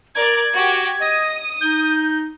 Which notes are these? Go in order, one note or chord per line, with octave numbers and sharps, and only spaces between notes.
A#4 D5 G#6
F#4 G4
D#5 D#6
D#4 G6